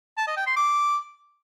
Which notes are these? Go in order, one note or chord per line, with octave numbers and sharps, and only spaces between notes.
A5
D#5
G5
C6
D6